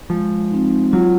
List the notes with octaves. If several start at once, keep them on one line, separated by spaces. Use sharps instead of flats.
F3 G#3
C4 D#4
F#3 F4